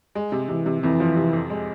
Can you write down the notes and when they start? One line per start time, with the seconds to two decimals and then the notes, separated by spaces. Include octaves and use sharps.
0.15 G#3
0.32 C3
0.49 C3 E3
0.66 C3
0.82 F2 E3
1.00 F3
1.16 C3
1.33 F2
1.50 G#3